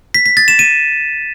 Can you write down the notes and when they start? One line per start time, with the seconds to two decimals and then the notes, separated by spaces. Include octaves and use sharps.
0.14 B6
0.26 B6
0.37 A6
0.48 E7
0.59 D#7